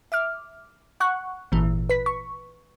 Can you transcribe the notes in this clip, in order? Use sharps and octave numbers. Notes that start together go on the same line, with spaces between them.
E5 D6 F6
F#5 C#6 F#6
G#1 A#2 E3
B4 B6
C#6